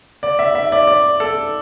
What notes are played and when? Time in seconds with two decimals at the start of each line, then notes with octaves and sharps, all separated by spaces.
0.23 D5
0.39 E5
0.55 E5
0.72 D5
0.87 D5
1.20 A4